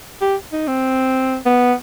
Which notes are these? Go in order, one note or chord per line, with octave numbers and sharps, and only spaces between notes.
G4
D#4
C4
B3